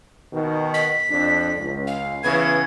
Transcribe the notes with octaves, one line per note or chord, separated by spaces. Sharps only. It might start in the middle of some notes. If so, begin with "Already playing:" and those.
B2 D#3
B6
F2 D4
C#2
F5
C#3 E3 B3 G#6